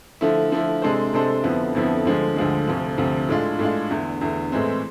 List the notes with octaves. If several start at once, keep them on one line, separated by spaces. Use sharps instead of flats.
D3 F3 A3 E4
D3 F3 A3 E4
C3 G#3 D4 A4 C5
C3 G#3 D4 A4 C5
F2 D3 F3 B3 E4
F2 D3 F3 B3 E4
D2 D3 F3 G#3
D2 D3 F3 G#3
D2 C3 F3
D2 C3 F3
A2 G#3 D4 F4
A2 G#3 D4 F4
E2 D3 A3
E2 D3 A3
A2 E3 G#3 C4